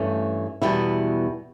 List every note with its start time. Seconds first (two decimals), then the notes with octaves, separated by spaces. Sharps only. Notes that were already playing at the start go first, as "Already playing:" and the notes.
Already playing: G2 E3 A3 C#4
0.62 E2 B2 G3 B3 E4